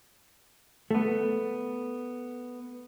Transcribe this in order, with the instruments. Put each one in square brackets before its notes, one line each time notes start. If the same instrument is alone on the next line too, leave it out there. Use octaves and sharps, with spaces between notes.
[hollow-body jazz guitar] A3 B3